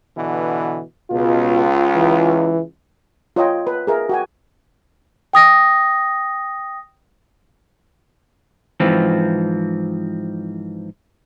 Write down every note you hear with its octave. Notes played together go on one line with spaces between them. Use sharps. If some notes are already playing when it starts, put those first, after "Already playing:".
B2 D3 E3
C#2 B2 F4
E3
F4 C#5 D#5 G5
B4
G#4 A#4 E5
F#4 G5 G#5
G5 D#6 A#6
G#2 E3 F3 C4